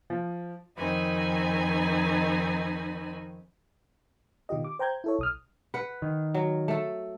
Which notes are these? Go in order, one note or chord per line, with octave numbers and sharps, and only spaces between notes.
F3
F2 D#3 C4 D#4 G#5 B5
B2 D#3 F4 G4 D#5
D6
C5 G5 A#5 G6 G#6
E4 A4 C#5
B1 D#6 F6
B4 F#5
D#3
F#3
A3 A4